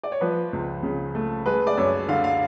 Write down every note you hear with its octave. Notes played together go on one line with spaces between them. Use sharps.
D5
C#5
F3 B4
C#2
C#3
A3
G#3 B4
D5
F#2 C#5
D3 F5
F5